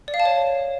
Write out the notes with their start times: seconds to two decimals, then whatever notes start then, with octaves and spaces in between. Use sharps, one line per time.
0.08 D5
0.14 F5
0.20 A5
0.25 C#5